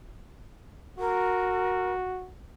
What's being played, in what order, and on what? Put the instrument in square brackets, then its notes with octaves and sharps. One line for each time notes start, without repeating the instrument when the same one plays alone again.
[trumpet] F#4 [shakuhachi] A#4